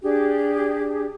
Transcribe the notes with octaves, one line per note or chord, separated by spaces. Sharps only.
D4 G4 G#4